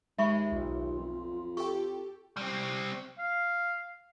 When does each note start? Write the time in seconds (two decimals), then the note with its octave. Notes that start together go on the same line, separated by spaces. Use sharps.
0.18 D#2 G#3 E5 B5 C#6
0.52 B1 F4
0.98 F2
1.57 G4 A4 G5 C#6
2.37 G3 C4
3.19 F5